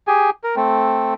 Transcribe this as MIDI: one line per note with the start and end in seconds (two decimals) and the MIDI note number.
0.07 0.30 67
0.07 0.30 68
0.07 0.30 80
0.44 0.55 70
0.56 1.14 57
0.56 1.14 60